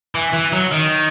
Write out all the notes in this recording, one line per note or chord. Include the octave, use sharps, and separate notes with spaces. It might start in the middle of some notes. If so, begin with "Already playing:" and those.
E3
E3
F#3
D#3